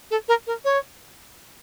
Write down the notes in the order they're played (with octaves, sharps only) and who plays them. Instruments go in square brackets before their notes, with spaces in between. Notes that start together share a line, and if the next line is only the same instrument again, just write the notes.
[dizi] A4
A#4
A#4
C#5